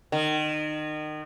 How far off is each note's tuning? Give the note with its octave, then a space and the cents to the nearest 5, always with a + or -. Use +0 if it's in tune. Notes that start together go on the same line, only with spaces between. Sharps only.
D#3 -30